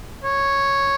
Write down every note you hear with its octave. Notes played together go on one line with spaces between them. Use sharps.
C#5